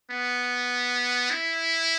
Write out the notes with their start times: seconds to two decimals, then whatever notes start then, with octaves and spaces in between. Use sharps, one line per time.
0.11 B3
1.30 E4